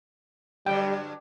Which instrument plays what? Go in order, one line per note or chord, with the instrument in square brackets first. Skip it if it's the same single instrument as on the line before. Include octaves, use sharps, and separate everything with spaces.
[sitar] G2 D3 F#3 [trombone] G3 [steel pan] G5